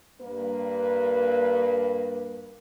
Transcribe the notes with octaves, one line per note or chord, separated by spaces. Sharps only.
G2 A#3 B4